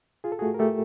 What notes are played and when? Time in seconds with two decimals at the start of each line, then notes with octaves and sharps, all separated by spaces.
0.24 F4 G#4
0.32 A4
0.39 F#4 G#4
0.42 A3
0.54 A#4
0.59 A3 G4 A4